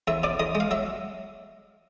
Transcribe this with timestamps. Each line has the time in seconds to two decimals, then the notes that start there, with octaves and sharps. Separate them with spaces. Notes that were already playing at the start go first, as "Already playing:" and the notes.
0.07 E2 E5
0.23 B2 D5
0.39 E2 D#5
0.55 G#3
0.60 F5
0.71 F#3 E5